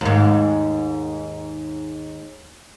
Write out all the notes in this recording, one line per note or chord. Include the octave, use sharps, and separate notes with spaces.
D#2 G#2